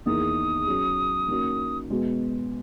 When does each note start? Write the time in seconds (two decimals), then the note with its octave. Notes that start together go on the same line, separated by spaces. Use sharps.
0.06 E2 D#3 A#3 E4 G#4 D#6
0.67 F#3 C#4 G#4
1.28 D#3 A#3 C#4 F#4
1.90 B2 G#3 B3 F#4